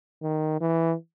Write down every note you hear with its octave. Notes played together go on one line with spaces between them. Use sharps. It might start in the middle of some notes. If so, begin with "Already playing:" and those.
D#3
E3